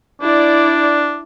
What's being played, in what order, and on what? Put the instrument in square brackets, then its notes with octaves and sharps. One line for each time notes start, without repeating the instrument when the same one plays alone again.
[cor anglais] D4 [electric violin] E4 D5